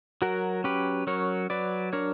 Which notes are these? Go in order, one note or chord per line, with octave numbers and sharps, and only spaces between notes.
F#3 F#4 A#4
C#4 G4 B4
F#3 A#4 C#5
F#3 B4 D5
D4 A#4 C#5